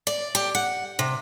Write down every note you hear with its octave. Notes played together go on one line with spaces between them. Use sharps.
D5
G4
F#5
C3